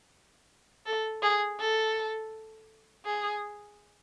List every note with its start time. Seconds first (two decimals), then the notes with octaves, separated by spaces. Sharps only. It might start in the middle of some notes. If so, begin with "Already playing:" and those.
0.86 A4
1.23 G#4
1.60 A4
3.06 G#4